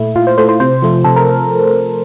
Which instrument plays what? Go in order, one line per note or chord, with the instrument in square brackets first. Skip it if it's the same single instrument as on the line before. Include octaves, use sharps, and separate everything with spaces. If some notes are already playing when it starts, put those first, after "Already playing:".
Already playing: [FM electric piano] A#2 A3 E4
A#2 F4
C5
A3 C5
C5
C3 C5
F3 A3
C3 A4
A#4